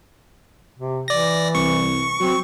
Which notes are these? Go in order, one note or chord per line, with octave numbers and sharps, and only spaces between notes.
C3
E3 D5 A#6
C2 C#6
F#3 C4